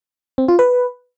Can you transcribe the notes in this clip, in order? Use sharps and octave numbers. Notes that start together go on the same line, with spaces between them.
C4
F4
B4